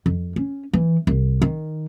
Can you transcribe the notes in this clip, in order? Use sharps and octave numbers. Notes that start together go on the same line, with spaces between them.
F2
C#4
E3
C2
D#3